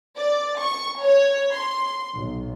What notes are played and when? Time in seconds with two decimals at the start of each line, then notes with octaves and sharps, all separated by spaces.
0.16 D5
0.59 C#6
1.01 C#5
1.51 C6
2.15 B1